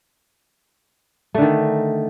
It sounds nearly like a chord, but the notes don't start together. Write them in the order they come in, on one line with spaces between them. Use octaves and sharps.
A3 D3 D#3